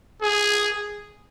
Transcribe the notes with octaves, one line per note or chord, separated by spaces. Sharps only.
G#4